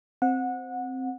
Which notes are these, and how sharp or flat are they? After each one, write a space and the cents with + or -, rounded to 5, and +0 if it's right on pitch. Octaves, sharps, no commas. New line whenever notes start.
C4 +0 F#5 -20